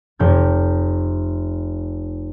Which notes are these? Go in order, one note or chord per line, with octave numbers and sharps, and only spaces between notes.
F1 G6 G#6